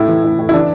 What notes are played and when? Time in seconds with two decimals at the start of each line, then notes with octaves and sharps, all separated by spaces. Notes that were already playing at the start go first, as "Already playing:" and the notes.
Already playing: A2 E4
0.08 E3
0.24 A2
0.39 A2
0.49 E4
0.54 E3 D4